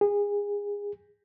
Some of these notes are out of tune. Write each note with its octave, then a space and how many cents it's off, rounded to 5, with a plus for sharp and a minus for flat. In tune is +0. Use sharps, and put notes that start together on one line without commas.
G#4 -25